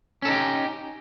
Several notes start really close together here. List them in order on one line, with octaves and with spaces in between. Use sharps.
C#4 A4 D#4 G4